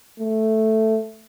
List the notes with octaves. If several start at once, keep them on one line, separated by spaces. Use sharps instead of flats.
A3